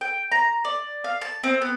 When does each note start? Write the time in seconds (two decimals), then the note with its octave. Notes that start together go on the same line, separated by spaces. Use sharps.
0.01 G5
0.32 A#5
0.65 D5
1.04 F5
1.21 A5
1.44 C4
1.61 B3